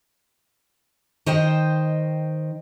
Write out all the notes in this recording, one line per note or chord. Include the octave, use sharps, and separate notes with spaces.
D#3 C5 D#5 G5